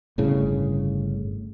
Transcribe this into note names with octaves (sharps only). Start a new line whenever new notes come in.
G1 A2 C#3